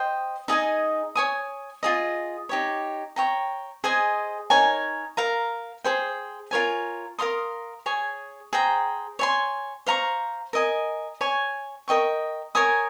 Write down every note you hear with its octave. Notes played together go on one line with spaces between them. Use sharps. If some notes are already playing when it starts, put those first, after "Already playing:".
Already playing: C5 D#5 G5
D#4 G#4 D#5 G#5
C#5 G#5 D#6
F4 G#4 D#5
D#4 G4 C#5
C#5 G5 A#5
G#4 C5 D#5 G#5
D#4 A#4 C#5 G#5
A#4 F5 A#5
G#4 C5 G5
F4 A#4 C#5 G#5
A#4 F5 C6 D#6
G#4 C#5 G#5
G#4 C5 G5 A#5
C#5 G#5 C6
C5 F5 A#5 C#6
A#4 D#5 G#5
C#5 G#5 C#6
A#4 D#5 G5 C#6
A#4 C#5 G#5 D#6